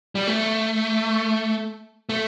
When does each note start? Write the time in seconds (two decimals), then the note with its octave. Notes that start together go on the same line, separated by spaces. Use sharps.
0.15 G3
0.27 A3
2.09 A3